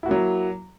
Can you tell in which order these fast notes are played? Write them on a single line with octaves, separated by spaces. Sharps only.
E4 F#4 A#3 F#3